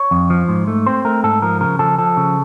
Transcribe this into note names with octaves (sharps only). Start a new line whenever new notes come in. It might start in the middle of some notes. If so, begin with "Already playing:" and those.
Already playing: C#5
F2
F3
G#2
A3
C4 C5
A3 A#4
G#2 A4
F3 A#4
C#3 A#4
F3 A4
F3 A4
C#3